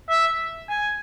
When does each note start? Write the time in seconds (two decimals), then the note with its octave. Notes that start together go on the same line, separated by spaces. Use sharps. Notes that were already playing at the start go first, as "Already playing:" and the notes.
0.09 E5
0.70 G#5